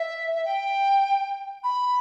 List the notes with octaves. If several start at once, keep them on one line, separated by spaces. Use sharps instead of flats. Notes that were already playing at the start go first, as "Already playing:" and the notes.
Already playing: E5
E5
G5
B5